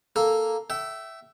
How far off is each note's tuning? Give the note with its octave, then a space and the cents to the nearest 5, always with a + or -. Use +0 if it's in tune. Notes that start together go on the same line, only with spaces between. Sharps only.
A#3 +0 A4 +0
E5 +5 G5 -35